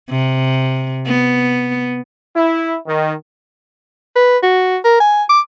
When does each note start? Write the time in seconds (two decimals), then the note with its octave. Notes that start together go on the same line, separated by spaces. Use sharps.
0.10 C3
1.06 B3
2.36 E4
2.87 D#3
4.16 B4
4.43 F#4
4.85 A#4
5.00 G#5
5.30 D6